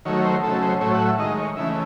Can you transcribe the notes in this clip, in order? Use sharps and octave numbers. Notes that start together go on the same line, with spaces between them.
D#3 F#3 A3 C#5
C5
C#3 F#3 A3 A4
C5
A2 F#3 A3 C#5
F#5
E5
D#3 G#3 D#5
C#5
C#3 E3 A3 E5